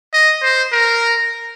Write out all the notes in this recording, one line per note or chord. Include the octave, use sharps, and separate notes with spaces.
D#5
C5
A#4